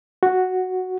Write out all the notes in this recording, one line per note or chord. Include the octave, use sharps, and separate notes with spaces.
F#4